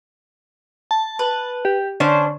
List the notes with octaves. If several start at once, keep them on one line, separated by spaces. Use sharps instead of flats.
A5
B4
G4
D3 C#4 D4 C5